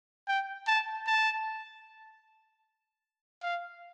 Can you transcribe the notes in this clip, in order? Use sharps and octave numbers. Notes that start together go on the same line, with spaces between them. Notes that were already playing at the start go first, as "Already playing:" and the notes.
G5
A5
A5
F5